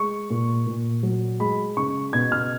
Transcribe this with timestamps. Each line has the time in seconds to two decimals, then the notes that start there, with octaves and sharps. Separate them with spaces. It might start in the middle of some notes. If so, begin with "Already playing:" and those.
Already playing: G#3 C#6
0.30 A#2
0.67 A#2
1.03 F#3
1.40 G#3 B5
1.77 C#3 C#6
2.13 B2 G#6
2.32 F6